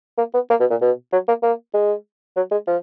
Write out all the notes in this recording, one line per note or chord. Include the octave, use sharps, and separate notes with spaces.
A#3
B3
A#3
B2
A#2
B2
F#3
A#3
A#3
G#3
F#3
G#3
F3